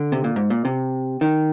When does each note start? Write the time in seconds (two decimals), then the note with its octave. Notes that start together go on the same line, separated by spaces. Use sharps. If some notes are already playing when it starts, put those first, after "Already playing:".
Already playing: D3
0.12 C3
0.24 A#2
0.36 G#2
0.50 A#2
0.65 C3
1.21 D#3